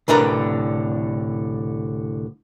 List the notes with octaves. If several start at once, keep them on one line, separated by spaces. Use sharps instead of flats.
C2 A2 D3 D4 A#4 B4